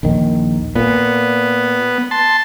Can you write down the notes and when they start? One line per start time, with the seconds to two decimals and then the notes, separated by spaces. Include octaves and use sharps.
0.03 A#1 D#2 D#3
0.75 A#2 B3
2.11 A5 C6